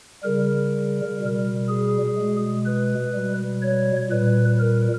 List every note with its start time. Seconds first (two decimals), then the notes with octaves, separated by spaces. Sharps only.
0.23 C#3 G3 A#4
1.20 B2 G3
1.68 G#4
2.17 B2 G#3
2.65 B4
3.14 B2 G3
3.62 C#5
4.10 A#2 G3 B4
4.59 A#4